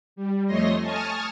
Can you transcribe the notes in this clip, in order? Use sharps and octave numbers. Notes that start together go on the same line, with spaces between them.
G3
F2 A3 C#5 D#5 C6 A#6
G#5 A5 C#6 D#6 F6 A6